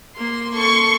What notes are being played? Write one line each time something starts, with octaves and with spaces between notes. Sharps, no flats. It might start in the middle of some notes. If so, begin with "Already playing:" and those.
A#3 C6
A4 C6 C#6